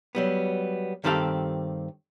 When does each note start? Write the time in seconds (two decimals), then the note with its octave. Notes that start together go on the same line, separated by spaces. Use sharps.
0.15 F#3 G3 B3
1.04 G2 D#3 C4 G4 A4 F5